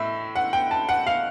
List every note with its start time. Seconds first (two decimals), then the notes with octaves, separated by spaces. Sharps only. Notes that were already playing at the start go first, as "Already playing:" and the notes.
Already playing: A2 E5
0.36 F#5
0.53 G5
0.71 A5
0.89 F#5
1.06 F5